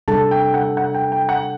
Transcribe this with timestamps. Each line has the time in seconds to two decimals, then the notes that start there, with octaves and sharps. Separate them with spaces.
0.08 C3 G3 D4 A4 A5
0.31 G5
0.54 F#5
0.77 F#5
0.94 G5
1.12 G5
1.29 F#5